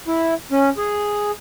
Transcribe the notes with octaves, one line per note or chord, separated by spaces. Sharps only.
E4
C#4
G#4